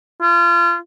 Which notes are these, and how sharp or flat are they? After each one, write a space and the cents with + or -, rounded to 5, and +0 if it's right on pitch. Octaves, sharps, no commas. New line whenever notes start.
F4 -30